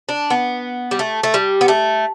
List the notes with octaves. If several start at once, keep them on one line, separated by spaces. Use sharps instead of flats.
D4
B3
G3
A3
A3
G3
B3
A3